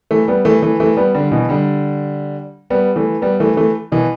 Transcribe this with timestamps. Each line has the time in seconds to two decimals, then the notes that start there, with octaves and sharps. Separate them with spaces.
0.11 E3 A3
0.28 G3 B3
0.45 E3 A3
0.62 E3 A3
0.80 E3 A3
0.97 G3 B3
1.14 D3 G3
1.31 B2 E3
1.49 D3 G3
2.70 G3 B3
2.96 E3 A3
3.22 G3 B3
3.40 E3 A3
3.57 E3 A3
3.92 B2 E3